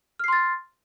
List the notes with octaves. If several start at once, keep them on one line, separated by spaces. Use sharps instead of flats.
C6 F6 A6 C7